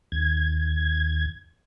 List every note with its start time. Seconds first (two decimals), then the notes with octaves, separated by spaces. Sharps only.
0.12 D#2 G#6